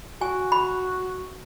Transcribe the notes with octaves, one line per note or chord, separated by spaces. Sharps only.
F#4 G#5
B5